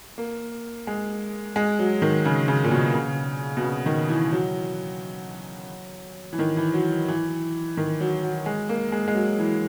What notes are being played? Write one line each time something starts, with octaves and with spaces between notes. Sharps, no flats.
A#3
G#3
G#3
F#3
D#3
C#3
C#3
A#2
B2
C#3
B2
C#3
D#3
E3
F#3
E3
D#3
E3
F#3
E3
D#3
F#3
F#3
G#3
A#3
G#3
G#3
F#3
E3